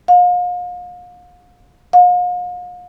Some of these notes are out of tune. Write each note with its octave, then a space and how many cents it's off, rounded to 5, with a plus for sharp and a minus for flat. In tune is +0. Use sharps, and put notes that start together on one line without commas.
F5 +40
F5 +45